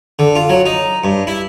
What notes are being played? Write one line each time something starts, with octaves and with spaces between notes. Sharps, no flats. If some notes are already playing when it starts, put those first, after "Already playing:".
D3
F4
F#3
D#4
G2
E4